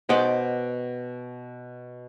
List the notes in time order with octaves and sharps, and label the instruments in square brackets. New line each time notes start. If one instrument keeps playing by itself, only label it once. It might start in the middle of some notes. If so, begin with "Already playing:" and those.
[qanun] B2 G5 D6 [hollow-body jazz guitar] C5 D#5 F#5